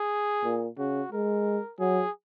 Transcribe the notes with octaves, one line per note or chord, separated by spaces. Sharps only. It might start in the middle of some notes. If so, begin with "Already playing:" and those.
Already playing: G#4
A#2
C#3 F#4
G#3 A#4
F#3 G#4